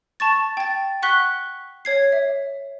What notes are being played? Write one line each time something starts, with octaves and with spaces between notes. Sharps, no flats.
A5 C#6 A6
G5 A6
F#5 C#6 F#6 B6 G7
C#5 G#6 C7
E5